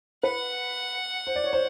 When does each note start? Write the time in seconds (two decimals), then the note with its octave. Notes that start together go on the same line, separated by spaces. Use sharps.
0.23 B4 F#5
1.27 C5
1.36 D5
1.44 C#5
1.53 C5